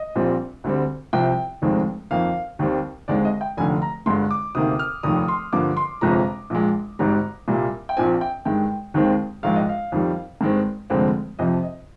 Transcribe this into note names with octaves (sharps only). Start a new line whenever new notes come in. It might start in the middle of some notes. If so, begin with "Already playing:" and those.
Already playing: D#5
A#1 A#2 G3 C4
D2 D3 G3 C4
C2 C3 F3 G5
F1 D#2 D#3 G#3 C4
F2 D#3 A#3 F5
D#2 D#3 G3 C4
D#2 D3 G#3 C4 D5
D#5
G5
F1 D#2 D3 G#5
A#5
G1 G2 D3 G#3 C6
D6
D2 C3 D#3 A#3 D#6
F6
F1 D#2 D#3 D#6
C6
G2 D3 F3 A#3 D6
C6
G1 F2 C3 F3 G#3 A#5
A#1 A#2 G#3
G#1 G#2 G3 A#5
C2 A#2 G3 A#3
G5
A#1 A#2 F3 C4 G#5
G5
G2 D#3 G#3 G5
D#2 D#3 G#3 C4
A#1 G#2 D#3 G#3 F5
D#5
F5
F2 D#3 G3
G2 D#3 G#3 C4
F1 F2 D3 G#3 C4
F2 C3 F3 D#5
D#5